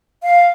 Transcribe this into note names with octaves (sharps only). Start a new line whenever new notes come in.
F5